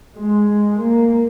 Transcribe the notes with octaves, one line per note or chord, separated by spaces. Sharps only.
G#3
A#3